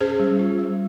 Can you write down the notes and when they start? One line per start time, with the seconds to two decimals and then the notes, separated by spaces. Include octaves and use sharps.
0.01 C#4 G#4 C5
0.19 G3
0.39 F4
0.59 G3